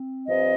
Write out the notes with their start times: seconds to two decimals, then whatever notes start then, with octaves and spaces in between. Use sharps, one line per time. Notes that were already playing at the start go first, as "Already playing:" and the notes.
Already playing: C4
0.26 G2 F3 C4 D#5